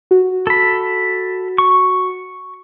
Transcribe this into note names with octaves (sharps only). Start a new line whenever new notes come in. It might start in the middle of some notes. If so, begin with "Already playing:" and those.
F#4
A4 B5
C#6